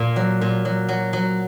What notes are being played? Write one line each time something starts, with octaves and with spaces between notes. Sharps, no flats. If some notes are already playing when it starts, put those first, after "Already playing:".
Already playing: A#2 A#3
F#3
A#2
F#3
F#3
F#3